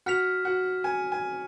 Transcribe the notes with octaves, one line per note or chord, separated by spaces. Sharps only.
F#4 F#5 F6 B6 F7
F#4 F#5
G#5
G#5